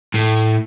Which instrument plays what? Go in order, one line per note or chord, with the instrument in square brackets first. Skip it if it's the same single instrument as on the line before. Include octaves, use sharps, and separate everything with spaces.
[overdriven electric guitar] A2